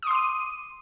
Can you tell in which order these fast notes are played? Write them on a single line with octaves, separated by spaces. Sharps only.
D#6 C6 D6 D#7